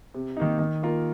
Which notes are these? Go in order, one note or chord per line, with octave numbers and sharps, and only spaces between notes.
C3
D#3 A#3 D#4
D#3
A#3 F4 A#4